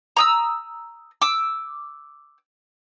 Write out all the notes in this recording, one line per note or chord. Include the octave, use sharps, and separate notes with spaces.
A#5 D#6 E6
D6 E6